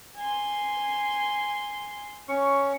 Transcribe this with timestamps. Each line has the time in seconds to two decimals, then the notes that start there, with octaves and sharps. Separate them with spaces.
0.18 G#5 C6
2.28 C#4 C#6